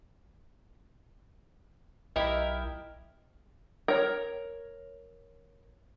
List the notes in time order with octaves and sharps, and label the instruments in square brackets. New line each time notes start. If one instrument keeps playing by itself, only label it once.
[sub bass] B1 [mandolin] E4 G4 A#4 [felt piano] D#5
[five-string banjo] A#4 C#5